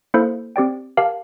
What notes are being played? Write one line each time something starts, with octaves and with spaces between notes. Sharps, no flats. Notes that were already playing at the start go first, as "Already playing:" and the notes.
A#3 E4 A4 C5
C4 G4 D5 G5
G4 A#4 F5 A5